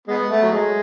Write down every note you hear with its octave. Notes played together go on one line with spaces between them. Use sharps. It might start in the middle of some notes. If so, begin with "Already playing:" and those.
G#3 B3
A3
F#3
G#3